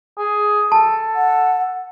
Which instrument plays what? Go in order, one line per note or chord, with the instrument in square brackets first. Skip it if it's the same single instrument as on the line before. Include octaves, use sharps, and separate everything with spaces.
[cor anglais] G#4
[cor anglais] A4 [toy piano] A5
[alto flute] F#5